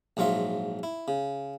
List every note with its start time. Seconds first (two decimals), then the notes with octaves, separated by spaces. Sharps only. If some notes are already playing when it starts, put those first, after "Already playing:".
0.17 A#1 G#2 F#3 F4 E5
0.83 E4
1.08 C#3